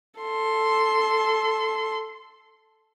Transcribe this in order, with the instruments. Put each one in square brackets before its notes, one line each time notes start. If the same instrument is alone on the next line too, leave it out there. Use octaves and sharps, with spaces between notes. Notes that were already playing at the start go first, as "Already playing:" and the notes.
[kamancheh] A4 C6